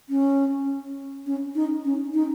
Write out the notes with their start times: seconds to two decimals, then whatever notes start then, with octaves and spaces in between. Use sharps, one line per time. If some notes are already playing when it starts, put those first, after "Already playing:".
0.09 C#4
1.26 C#4
1.55 D#4
1.85 C#4
2.14 D#4